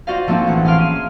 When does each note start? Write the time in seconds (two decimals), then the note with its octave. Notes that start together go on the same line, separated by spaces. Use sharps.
0.07 F4 F#4 C5 D5 D#5 F5
0.27 F3 A3 A#3 C4 D4
0.47 A1 E3 F#5
0.64 C#4 G#4 F5 C6 F6 D7
0.78 C#4 D#7